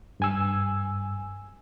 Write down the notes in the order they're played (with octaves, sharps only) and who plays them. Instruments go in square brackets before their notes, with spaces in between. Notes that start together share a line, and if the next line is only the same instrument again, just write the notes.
[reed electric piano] G2 G#5 E6